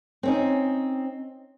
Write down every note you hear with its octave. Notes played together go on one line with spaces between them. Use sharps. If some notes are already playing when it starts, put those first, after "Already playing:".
C4 C#4 D#4